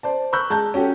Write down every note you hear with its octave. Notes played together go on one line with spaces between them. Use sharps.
C5 D5 A5
B5 C#6 E6 F#6 G6
G#3 A5 A#5 G6
C#4 F#4 G4 A4